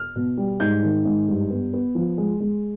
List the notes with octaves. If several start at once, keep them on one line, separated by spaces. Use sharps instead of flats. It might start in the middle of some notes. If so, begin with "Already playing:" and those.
Already playing: F6
B2
G3
G#2 G6
D#3
G#2
G2
B3
B3
F3
G#3
G#3